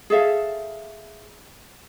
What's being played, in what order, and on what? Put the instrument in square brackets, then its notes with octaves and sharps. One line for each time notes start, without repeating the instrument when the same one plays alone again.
[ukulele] G#4 A4 E5 F5